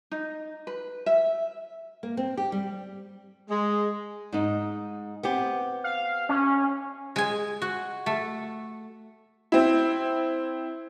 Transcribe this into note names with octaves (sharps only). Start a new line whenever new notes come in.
D#4
B4
E5
A#3
C4
G4
G3
G#3
G#2 D#4
B3 C4 G4
F5
C#4
G#3 G#5
F#4
A3
C4 E4